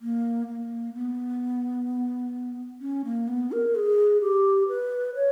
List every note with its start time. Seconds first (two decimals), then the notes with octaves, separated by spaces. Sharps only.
0.01 A#3
0.48 A#3
0.94 B3
2.81 C#4
3.05 A#3
3.28 B3
3.52 A#4
3.75 G#4
4.21 G4
4.68 B4
5.15 C#5